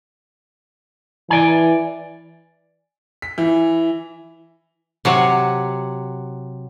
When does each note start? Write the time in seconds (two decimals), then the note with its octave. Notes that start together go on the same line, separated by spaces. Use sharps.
1.30 E3 D5 G#5
3.22 B6
3.38 E3
5.05 C3 F#3 F#5